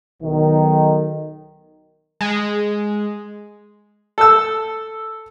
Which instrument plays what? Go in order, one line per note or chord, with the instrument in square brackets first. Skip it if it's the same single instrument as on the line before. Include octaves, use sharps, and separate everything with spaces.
[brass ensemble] B1 D#3
[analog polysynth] G#3
[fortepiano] A4 E6